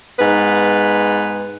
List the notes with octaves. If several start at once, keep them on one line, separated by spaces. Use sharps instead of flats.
G#2 B3 B4